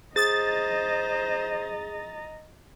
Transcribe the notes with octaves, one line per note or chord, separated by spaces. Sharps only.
G#4 C5 D#5 A#5 D#6 A6